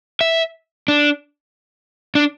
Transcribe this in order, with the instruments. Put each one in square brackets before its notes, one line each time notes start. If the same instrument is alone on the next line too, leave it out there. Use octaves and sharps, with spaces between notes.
[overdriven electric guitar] E5
D4
D4